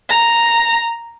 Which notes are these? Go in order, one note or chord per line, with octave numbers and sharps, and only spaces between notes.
A#5